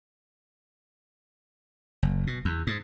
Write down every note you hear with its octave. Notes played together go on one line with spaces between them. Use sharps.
F#1
B2
E2
G#2